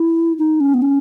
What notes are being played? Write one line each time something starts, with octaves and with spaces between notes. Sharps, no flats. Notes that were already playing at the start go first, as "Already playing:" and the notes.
Already playing: E4
D#4
C#4
B3
C#4